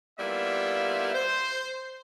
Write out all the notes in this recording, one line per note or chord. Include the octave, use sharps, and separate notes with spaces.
G3 A#3 B3 E4 F4 E5
C5